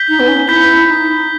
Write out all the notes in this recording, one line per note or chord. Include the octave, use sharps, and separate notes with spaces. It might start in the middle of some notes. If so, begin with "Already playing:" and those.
Already playing: G6 B6 G7
D#4
B3
C#4
E4 G6 B6 G7
D#4